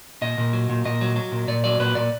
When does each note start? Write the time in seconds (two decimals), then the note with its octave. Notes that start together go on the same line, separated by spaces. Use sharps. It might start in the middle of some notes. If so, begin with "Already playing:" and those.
0.21 A#2 D#5
0.38 A#2
0.53 F#3
0.69 A#2
0.85 A#2 D#5
1.01 F#3
1.16 F#3
1.32 A#2
1.48 A#2 D5
1.64 F#3 D5
1.79 A#2 B4
1.95 A#2 D5